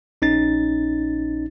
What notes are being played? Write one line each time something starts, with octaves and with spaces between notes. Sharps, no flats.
A#1 C#4 D#4 A6